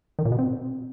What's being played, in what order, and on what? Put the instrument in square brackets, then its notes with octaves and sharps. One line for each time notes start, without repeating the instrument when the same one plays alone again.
[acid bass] D#3
A#2
B2
C4